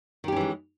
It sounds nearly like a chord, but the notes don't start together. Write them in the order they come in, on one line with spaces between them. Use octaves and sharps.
D#3 G4 C#4 E3 G#3